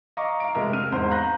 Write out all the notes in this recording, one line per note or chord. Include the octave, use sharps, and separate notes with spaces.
D#5 F5 A#5 C#6 D6
F5 A#5 D7
F1 G#3 A#4 D#5 E5
C3 F6 D#7
E2 G#2 C4 C5
F5 A#5 B5 F#6 G6 A#6